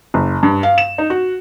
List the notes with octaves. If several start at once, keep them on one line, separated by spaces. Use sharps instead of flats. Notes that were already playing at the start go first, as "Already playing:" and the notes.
F#1
G2
F5
E7
D#4
F#4